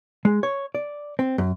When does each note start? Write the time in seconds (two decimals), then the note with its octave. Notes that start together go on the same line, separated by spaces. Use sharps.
0.25 G#3
0.43 C#5
0.75 D5
1.19 C4
1.38 F#2